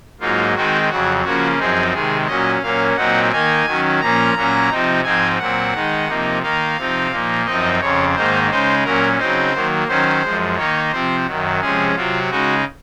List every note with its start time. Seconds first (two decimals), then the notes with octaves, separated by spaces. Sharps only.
0.20 G#2 F#3 A#3 D#4 F4
0.54 D#3 G#3 C4 D#4 F#4
0.89 F2 C#3 F#3 F#4
1.23 C#3 F3 A#3 C#4 F#4
1.58 F#2 F3 C4 D#4 G#4
1.93 C3 D#3 G#3 G#4
2.27 A#2 F#3 C#4 D#5
2.62 A#2 F#3 A#3 C#4 F5
2.96 A#2 F#3 C4 D#4 F#5
3.31 D#3 A#3 D#4 G#5
3.66 D#3 F#3 C#4
4.00 A#2 F3 A#3 C#4 A#5
4.35 A#2 F#3 A#3 C#4
4.70 C3 F3 C4 D#4
5.03 G#2 F3 C4 D#4 G#5
5.38 A#2 F#3 C4 F#5
5.74 D#3 G#3 D#4
6.07 C3 F3 A#3 D#4
6.42 D#3 A#3 D#4 F5
6.77 C3 F3 C4 D#4
7.11 A#2 F3 A#3 D#4
7.45 F#2 F3 C4 D#4 D#5
7.81 F2 C#3 F3 C#5
8.15 G#2 D#3 A#3 D#4 C5
8.50 C#3 G#3 D#4 C5
8.84 A#2 F#3 C#4 A#4
9.18 C#3 F#3 C4 D#4 C5
9.54 D#3 F#3 A#3
9.88 D#3 F#3 C#4 C5
10.23 F#2 F3 G#3
10.57 D#3 A#3 D#4 C#5
10.92 C3 F3 C4 C5
11.26 F#2 D#3 F#3
11.60 C3 F3 G#3 C#4 G#4
11.95 C3 F#3 C4 F4
12.30 C#3 G#3 D#4 F#4